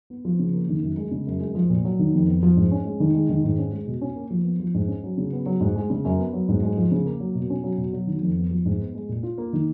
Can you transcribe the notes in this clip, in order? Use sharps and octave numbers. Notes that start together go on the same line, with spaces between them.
B3
F3
C#3
A#3
D#3
F#2
G#3
C#3
F#2
G#3
F3
A#2
F#3
D#3
F2
B3
F3
G#2
C#4
G#3
D#3
G#3
D#3
G#2
C#4
G#3
B2
C#4
A#3
F3
B3
F3
G#2
C#4
F#3
C#3
B3
F#3
G#2
G#3
C#3
F#2
B3
F#3
G#2
G#3
F3
C#3
A#3
F#3
B2
C#4
F#3
B2
F#3
D#3
F2
B3
F3
G#2
B3
G#3
A#2
F4
A#3
D#3